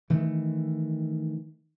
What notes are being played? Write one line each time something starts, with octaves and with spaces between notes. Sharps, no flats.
D#3 E3 A3